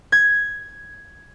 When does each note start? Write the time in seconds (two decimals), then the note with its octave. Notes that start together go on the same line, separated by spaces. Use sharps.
0.12 G#6